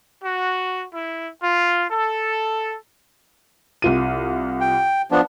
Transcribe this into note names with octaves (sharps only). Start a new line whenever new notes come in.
F#4
E4
F4
A4
C2 F4 D#7
G5
F3 B3 D4